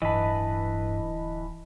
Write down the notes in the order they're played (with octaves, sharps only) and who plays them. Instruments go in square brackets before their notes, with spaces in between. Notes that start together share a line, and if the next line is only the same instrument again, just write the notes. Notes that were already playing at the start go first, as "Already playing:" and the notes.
[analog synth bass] D1 [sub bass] G2 [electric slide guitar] E3 B4 [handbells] D#5 A5